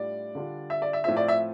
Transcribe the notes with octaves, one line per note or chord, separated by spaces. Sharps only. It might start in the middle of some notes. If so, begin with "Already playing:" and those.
Already playing: A2 G3 D4 F4 D5
D3 G3 D4 F4
E5
D5
E5
A2 F3 C4 F4 E5
D5
E5